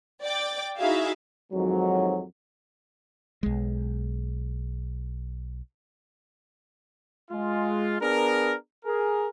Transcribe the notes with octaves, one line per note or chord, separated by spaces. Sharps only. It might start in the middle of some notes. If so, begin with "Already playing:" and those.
D5 G5 D6
D#4 E4 F#4 G#4 E5 F5
F2 G#2 D#3 F#3
B1 G#3
G#3 F4
B3 D4 G#4 A#4
G#4 A#4